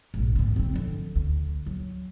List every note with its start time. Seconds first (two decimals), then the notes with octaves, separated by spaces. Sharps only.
0.14 A#1 G#2
0.36 D2 C#3
0.56 B3 C4
0.74 D3 F3
1.16 D2
1.66 F#3